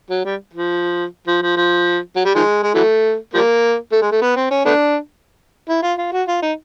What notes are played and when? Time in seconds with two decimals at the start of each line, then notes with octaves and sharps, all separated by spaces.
0.10 F#3
0.25 G3
0.54 F3
1.27 F3
1.42 F3
1.57 F3
2.16 F#3
2.25 G3
2.35 D#3 F3 G#3
2.63 G#3
2.75 E3 F#3 A3
3.34 F3 G3 A#3
3.92 A3
4.02 G#3
4.12 A3
4.22 B3
4.36 C4
4.51 C#4
4.65 A3 B3 D4
5.69 E4
5.83 F4
5.98 F4
6.13 F#4
6.28 F4
6.42 D#4